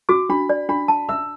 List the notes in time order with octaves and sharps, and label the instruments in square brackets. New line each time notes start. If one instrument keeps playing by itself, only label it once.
[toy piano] F#4 [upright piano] D6
[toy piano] D4 [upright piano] B5
[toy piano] D5
[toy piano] D4 [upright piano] B5
[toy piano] A5
[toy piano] E5 [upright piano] E6